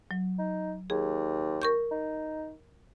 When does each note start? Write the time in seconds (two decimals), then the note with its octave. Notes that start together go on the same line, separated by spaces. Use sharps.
0.11 F#3
0.38 D#4
0.90 D#2 G#4
1.62 A#4 C#6 G6
1.91 D#4